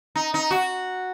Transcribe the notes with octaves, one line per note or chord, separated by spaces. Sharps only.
D#4
D#4
F#4